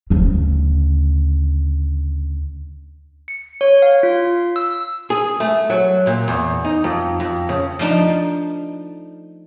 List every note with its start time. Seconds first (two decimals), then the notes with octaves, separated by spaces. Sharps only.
0.10 D2 C#3
3.28 C#7
3.61 C#5
3.82 F5
4.03 F4
4.56 E6
5.10 G#4
5.40 A3
5.70 F#3
6.07 A#2
6.28 E2
6.65 D#4
6.84 F2
7.20 F2
7.49 C#3
7.79 F3 A3 D4 D#4